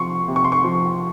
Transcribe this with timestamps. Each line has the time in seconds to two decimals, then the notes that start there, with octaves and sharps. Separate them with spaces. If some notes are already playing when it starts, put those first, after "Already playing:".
Already playing: C3 F3 C6 C#6
0.28 C3
0.36 C#6
0.44 C6
0.52 C#6
0.64 F3